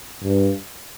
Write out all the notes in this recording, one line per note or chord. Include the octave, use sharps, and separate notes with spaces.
G2